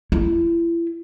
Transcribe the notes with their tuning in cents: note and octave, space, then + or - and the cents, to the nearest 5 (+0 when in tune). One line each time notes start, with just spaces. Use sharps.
E4 +35